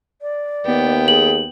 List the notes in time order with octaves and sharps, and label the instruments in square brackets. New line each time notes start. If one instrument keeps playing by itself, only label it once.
[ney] D5
[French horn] D#2 [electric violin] B3 G5
[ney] G#4 [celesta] F#7